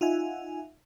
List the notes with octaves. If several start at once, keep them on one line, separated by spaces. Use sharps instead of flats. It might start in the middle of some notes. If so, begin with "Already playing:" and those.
D#4 F4 E5 F#5 G#5